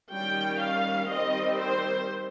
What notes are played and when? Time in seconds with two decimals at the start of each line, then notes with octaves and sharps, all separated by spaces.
0.11 D#3 G3 C#4 G5
0.59 F5
1.08 D#3 G3 C4 D#5
1.57 C5